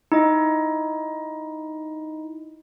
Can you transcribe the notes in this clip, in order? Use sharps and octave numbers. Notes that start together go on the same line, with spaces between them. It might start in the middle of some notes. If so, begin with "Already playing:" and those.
D#4 E4 D#5